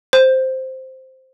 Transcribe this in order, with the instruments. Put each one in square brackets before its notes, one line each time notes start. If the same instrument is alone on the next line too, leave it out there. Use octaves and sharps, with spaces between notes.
[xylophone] C5